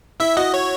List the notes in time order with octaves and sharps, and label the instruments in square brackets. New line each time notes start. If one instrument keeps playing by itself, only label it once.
[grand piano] E4 [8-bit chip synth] E5
[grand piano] F#4 [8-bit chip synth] D#5
[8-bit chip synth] C#5